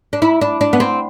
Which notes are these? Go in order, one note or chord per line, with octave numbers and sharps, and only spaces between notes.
D4
E4
D4
D4
B3
C4